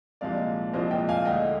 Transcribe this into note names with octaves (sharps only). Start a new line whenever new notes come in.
C2 A#2 F3 G#3 D5 F5
C2 A#2 F3 G#3 C5 D#5
D#5 G5
F5 G#5
D2 D3 G#3 D#5 G5